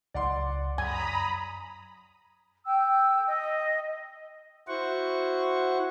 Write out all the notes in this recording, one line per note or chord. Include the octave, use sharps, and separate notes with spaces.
C#2 F#3 D5 F#5 C6
F#2 G#5 A#5 B5 D#6
G5 E6
D#5
E4 F#4 C5 F#5 C#6